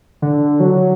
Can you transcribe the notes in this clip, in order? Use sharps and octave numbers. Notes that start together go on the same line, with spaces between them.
D3
F#3